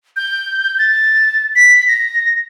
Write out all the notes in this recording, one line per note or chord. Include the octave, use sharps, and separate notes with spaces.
G6
A6
B6
A#6